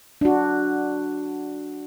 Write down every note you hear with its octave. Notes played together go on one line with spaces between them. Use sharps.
D4 F#4